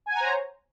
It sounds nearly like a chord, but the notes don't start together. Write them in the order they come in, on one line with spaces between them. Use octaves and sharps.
G#5 F#5 A#5 C5 C#5